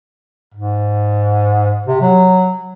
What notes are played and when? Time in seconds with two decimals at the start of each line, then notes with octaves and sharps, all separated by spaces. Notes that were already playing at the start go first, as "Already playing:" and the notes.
0.54 G#2
1.86 C3
2.01 F#3